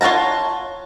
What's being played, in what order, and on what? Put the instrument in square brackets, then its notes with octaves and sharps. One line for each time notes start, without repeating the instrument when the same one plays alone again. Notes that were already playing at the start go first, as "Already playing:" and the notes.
[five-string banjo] F4 C#5 F#5 A5 A#5